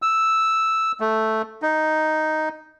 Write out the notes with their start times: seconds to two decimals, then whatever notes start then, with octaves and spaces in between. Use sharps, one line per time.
0.02 E6
1.00 A3
1.62 D#4